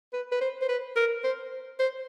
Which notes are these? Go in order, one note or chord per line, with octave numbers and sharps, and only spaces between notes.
B4
B4
C5
C5
B4
A#4
C5
C5